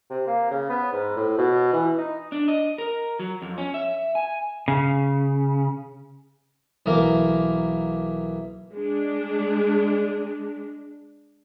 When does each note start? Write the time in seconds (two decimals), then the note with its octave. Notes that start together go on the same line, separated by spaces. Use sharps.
0.10 C3
0.27 A#3
0.51 C#3
0.69 B3
0.92 G#2
1.16 A2
1.38 B2
1.73 E3
1.98 D#4
2.32 D4
2.48 D#5
2.78 A#4
3.19 F#3
3.42 F2
3.58 C#4
3.74 E5
4.15 G#5
4.68 C#3
6.86 B1 E3 A#3 A#4
8.73 G#3 D4